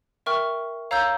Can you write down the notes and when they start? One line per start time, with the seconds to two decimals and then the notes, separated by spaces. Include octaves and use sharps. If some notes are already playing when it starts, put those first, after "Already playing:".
0.26 A#4 E5 G5 C#6 F6
0.91 C#5 F5 A#5 E6 G6